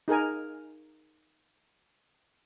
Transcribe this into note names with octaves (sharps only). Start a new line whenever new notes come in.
D#4 G#4 A#4 G#5